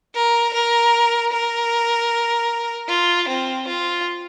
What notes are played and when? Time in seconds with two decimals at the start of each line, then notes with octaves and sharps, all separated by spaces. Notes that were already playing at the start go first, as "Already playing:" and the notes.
0.15 A#4
0.54 A#4
1.33 A#4
2.88 F4
3.28 C4
3.68 F4